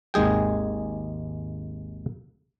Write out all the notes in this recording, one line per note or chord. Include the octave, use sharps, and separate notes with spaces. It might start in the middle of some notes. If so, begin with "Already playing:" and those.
G#1 D#2 G#3 G#4 G5